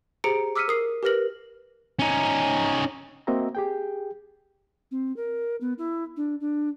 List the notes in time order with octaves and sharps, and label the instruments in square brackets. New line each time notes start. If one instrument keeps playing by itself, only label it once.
[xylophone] G4 G#4 C5 A#5 C#7 D7
D6 E6 F6 B6 C#7 D#7
A#4 D#6 C7
G4 A#4 B4 F6 A#6 F#7
[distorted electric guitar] C#4 D#4
[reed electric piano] A#3 C4 F#4 D#5 E5 A#5
G4 G#4 G5
[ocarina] C4
A#4
B3
E4
D4
D4